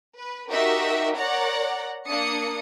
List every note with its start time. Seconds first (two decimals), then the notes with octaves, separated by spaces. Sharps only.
0.16 B4
0.50 D#4 F#4 G4 A#4 E5
1.16 A#4 C#5 D5 F#5 A#5
2.06 A#3 D4 D#6 C#7